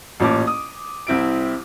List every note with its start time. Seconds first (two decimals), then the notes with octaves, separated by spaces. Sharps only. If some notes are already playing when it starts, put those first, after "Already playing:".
0.20 A1 A#2 C#4 A5 D6
0.47 D#6
1.07 C2 C4 E4 D7